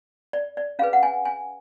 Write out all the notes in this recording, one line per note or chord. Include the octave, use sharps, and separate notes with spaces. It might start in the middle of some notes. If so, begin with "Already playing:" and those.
D5
D5
C#4 G#4 B4 F5
F#5
G#5
G#5